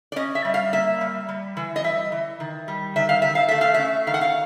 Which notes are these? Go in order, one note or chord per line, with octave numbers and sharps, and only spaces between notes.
D5
C#4 D#5
E5
G3
F5
A#3 E5
G3
G3
E3
D#5
G3 E5
E3
D#3
G3
D#3 E5
F5
D#3 E5
F5
A3 E5
F5
C#4 E5
D#3 F5
F#5
F5